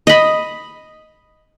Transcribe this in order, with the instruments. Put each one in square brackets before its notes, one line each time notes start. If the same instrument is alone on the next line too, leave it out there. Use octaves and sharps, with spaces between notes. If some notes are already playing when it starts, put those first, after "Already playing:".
[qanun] D#5 B5